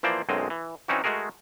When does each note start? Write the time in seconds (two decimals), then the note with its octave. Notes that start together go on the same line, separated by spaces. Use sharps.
0.03 E3 F3 A#3 C5 D5
0.29 B1 F#2 G#3 C4 D#5
0.50 E3
0.88 E3 C4 C#4 D#4 F#4
1.04 G#3 A3 F#4 G#4 A#4